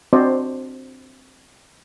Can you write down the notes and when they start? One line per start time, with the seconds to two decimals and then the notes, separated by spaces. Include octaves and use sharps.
0.13 C4 D4 F#4 C5 D5 D#5